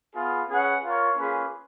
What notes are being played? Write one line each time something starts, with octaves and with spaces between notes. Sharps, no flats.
B3 F4 G#4 B4 F5
C#4 G#4 B4 F#5
F4 A#4 C#5
A#3 C#4 F4 G#4 B4